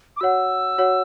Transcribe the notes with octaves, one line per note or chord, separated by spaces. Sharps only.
D6
F#4 C#5 F#5 E6
F#4 C#5 F#5